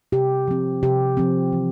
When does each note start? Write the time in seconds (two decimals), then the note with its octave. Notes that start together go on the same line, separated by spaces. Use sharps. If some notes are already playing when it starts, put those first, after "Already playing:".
0.12 C3 G4
0.48 F3 C4
0.83 C3 G4
1.17 F3 C4
1.53 E3